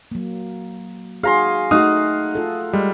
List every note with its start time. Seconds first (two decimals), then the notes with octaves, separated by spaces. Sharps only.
0.12 F#3 A#3
1.23 D#4 F#4 G#4 F5 A#5 C6
1.71 A3 D#4 F#4 F5 F#5 D#6
2.35 F4 A4
2.73 G3 G#3